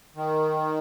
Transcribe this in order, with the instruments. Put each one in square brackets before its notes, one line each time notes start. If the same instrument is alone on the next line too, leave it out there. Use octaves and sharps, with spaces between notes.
[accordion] D#3